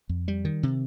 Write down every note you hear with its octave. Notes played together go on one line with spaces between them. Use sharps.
F2
G3
D#3
C3